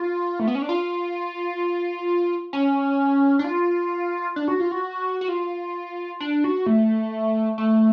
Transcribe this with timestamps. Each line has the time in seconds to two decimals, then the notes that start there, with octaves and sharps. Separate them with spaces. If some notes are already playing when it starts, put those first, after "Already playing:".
Already playing: F4
0.39 A3
0.47 B3
0.55 C#4
0.62 D4
0.69 F4
2.53 C#4
3.39 D4
3.44 F4
4.36 D4
4.48 F#4
4.60 F4
4.71 F#4
5.21 F#4
5.28 F4
6.20 D4
6.44 F#4
6.66 A3
7.58 A3